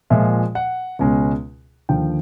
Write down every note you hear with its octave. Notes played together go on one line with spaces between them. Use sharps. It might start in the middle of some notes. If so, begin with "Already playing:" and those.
A#2 F3 G#3 E5
F#5
C#2 B2 G#3 C#4
D#2 D3 F3 G5